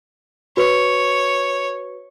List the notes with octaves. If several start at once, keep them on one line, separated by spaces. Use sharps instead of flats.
F#4 B4 C#5